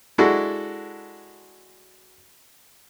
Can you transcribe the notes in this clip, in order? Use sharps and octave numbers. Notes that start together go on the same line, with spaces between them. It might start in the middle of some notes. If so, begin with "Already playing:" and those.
G#3 D4 E4 F#4 A4